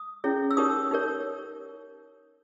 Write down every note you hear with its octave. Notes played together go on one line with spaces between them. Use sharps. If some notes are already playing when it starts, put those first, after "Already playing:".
Already playing: D#6
C#4 E4 G#4 C#5
E6
D#4 G4 A#4 C#5 D#6
D#4 G4 A#4 C#5